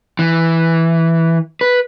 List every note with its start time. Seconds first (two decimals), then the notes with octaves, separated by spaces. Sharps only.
0.19 E3
1.61 B4